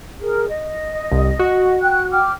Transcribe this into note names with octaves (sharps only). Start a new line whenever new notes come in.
G#4 A#4
D#5
C2
F#4
G5 F#6
G5 D6 F6